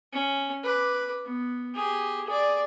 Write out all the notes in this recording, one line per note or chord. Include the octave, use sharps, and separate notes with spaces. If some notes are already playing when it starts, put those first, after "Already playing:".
C#4
B4 D6
B3
G4 G#4
G#4 D5